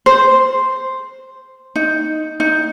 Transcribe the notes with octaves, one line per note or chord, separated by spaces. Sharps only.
C5
D#4
D#4